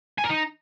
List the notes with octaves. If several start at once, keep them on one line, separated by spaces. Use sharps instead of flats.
G#5
A#4
D#4